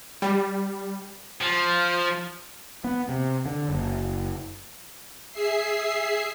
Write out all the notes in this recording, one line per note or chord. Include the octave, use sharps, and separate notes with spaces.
G3
F3
B3
C3
D3
F#1
G#4 E5 C7